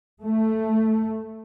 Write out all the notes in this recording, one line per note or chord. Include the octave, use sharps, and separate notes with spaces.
A3